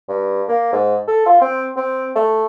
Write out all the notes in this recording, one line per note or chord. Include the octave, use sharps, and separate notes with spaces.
G2
A#3
G#2
A4
F4
C4
C4
A3